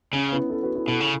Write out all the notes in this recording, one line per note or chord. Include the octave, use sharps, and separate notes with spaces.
C#3 C#4
B3 E4
E4 A4
F#4 B4
E4 A4
B2 E4 A4
C#3